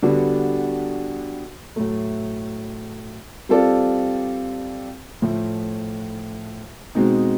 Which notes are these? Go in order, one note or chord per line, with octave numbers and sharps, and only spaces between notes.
D3 G3 B3 D4 F#4
A2 F#3 A3
G3 C4 F4 A4 D5
A2 F3 A3
B2 G#3 C4 D#4